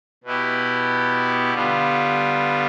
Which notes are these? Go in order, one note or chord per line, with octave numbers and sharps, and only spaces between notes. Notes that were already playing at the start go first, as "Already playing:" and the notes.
B2 B3 E4 G4
D3 G3 B3 F4